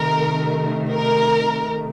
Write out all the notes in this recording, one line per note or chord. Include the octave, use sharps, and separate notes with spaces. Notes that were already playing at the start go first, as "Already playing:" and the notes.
Already playing: C3 D#3 A3 A#4
A#4